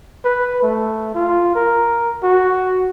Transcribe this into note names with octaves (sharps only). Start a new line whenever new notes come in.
B4
A3
F4
A#4
F#4